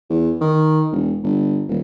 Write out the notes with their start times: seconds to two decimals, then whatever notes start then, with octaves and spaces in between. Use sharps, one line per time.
0.10 E2
0.41 D#3
0.92 E1
1.23 G1
1.68 D#1